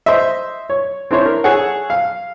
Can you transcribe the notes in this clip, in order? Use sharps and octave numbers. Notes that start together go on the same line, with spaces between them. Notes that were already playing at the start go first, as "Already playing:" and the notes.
C5 D#5 E5
C#5
C4 D4 E4 C5 C#5
A#4
G#4 A4 C#5 F#5
F5